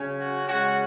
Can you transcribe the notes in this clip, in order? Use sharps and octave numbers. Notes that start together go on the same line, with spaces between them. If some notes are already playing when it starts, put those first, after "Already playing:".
Already playing: C#3 F#3 C#4
F#4
C#3 G#3 C#4 F#4